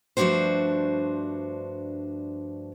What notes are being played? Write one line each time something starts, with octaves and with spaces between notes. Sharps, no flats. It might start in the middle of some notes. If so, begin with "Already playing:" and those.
G2 F3 A3 D4 F#4 C5